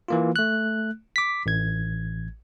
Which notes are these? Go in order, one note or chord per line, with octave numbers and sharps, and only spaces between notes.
E3 A#3 F4
A3 F#6
D6 B6
A1 G#6